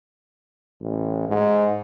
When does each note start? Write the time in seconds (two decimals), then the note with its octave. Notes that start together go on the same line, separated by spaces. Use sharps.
0.81 A1
1.29 G#2